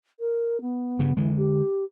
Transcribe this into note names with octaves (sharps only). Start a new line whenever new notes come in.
A#4
B3
G2 C#3
D3 E3 G#3
G4